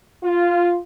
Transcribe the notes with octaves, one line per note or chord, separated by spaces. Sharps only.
F4